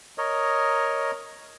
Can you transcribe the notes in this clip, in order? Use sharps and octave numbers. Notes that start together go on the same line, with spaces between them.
A#4 C#5 D#5